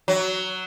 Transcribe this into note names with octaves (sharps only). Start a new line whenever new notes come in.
F#3